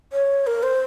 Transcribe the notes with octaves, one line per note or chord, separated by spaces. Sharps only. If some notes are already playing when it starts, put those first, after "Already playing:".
C#5
A#4
C5